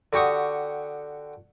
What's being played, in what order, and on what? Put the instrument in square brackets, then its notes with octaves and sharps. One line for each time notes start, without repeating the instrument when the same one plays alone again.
[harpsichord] D3 F#4 G4 C#6 D#6